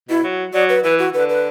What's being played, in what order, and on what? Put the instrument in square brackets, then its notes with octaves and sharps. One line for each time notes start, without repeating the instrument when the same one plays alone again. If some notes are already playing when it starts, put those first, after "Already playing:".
[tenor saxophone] B2 [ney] E4
[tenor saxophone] F#3
[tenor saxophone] F#3 [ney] D5
[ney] B4
[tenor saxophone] E3 [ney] B4
[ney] F#4
[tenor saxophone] D3 [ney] B4
[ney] B4